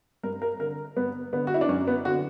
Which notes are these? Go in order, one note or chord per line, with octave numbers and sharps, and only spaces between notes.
G2 A#4
A#4
D3 A#4
G2 B3
D3 B3
F#4
E4
D4
F#2 C#4
B3
D3 F#4